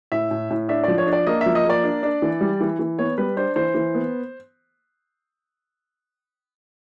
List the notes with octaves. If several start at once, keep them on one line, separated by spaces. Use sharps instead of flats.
A2 E5
A2
A2
D4 E5
F3 D5
C#5
D4
D5
A#3 D#5
F3 E5
D#5
A#3 D5
D4
D4
E3
G3
E3
E3
B3 C#5
G3 B4
D4 C5
E3 C5
E3
B3